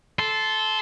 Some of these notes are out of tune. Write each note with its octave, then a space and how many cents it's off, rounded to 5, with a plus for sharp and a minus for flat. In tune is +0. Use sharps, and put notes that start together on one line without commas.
A4 -15 C6 +0